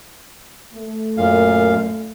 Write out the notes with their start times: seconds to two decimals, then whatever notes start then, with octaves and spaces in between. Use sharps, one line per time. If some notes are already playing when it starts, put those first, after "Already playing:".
0.73 A3
1.17 F#2 A#2 F5